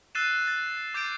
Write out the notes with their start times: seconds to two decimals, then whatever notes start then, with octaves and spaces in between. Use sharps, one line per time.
0.15 E6 F#6 A6 C7 D#7 E7
0.48 A6
0.94 D6 G6 A6 C7 D7